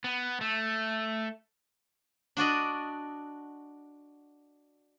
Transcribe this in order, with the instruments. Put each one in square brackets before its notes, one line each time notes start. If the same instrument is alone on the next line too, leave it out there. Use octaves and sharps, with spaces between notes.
[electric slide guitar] B3
A3
[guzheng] D4 F#4 D5 D#5